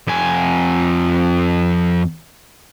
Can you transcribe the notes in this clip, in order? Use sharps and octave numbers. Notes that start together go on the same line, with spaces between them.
F2 G#5